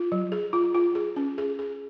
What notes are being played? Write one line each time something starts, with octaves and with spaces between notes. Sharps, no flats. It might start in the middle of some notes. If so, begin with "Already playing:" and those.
Already playing: F4
F#3
G#4
F4
F4
G#4
C#4
G#4
G#4